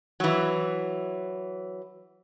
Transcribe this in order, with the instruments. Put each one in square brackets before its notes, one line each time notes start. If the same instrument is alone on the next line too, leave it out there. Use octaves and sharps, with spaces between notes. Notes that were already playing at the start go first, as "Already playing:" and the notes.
[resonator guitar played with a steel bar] E3 F#3